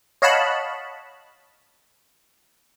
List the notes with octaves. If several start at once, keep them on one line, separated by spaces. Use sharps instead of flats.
C#5 D#5 F5 F#5 A5 B5